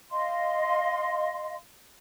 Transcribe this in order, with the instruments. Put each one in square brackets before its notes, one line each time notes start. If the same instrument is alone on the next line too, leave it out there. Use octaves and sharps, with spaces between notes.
[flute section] D#5 F5 C6